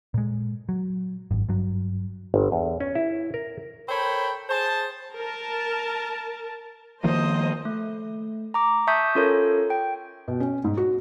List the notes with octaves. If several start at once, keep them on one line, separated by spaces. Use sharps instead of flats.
A#2 G#3
F#3
G#1 F#2
G2 F#3
G1
E2
C#4
E4
A#4
A4 A#4 C5 C#5 G5 B5
G#4 C5 A5
A#4 A5
D#3 F3 A#3 C5 D#5
A3
A#5 D6
E5 A5 C#6 D#6 G6 B6
C#4 F4 A4 A#4 C#5
G5
B2
C#4
G#2
F#4